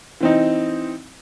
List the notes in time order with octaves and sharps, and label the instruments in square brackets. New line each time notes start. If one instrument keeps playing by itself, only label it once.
[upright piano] E3 C4 D#4